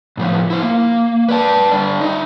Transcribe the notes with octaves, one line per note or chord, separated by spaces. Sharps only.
A2 C#3 F3 B3
E4 C5
A#3
B4 D5 A5
D3 G3 D5
D#4 E5